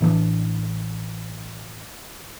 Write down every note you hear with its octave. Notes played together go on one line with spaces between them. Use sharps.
A1 E3 A3 D4